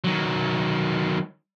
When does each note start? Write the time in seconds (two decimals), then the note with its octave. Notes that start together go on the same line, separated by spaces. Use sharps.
0.04 D#3 F#3